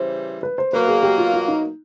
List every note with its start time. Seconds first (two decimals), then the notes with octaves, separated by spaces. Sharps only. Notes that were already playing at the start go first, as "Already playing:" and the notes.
Already playing: C#3 E3 G3 C5
0.43 B4
0.58 C5
0.73 B2 F#3 A#3 B4
0.88 G#4
1.03 G4
1.18 F4
1.34 F4
1.48 D#4